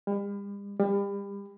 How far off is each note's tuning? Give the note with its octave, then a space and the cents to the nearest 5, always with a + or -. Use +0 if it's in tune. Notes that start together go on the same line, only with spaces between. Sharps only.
G3 +45
G3 +35